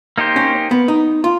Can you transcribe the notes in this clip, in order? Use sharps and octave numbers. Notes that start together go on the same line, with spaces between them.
A#3 D#4 G4 C5
C#4
B3
D#4
F4